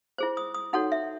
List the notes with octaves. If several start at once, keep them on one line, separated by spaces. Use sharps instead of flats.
E4 G#4 C5
D#6
D#6
D#4 F#4 A4 C#5 F#5
E5